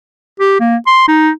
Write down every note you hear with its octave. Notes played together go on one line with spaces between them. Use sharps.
G4
A#3
C6
D#4